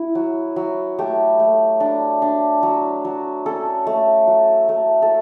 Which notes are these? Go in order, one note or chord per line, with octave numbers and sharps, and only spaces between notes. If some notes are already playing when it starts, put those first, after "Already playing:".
Already playing: E4
F#3
F#3
A3 G4
A3
D4
D4
F#3
F#3
C#4 A4
A3
F#3
A3
A4